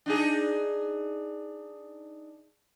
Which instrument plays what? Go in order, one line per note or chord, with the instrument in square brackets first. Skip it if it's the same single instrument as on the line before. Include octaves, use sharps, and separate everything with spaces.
[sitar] D4 D#4 G#4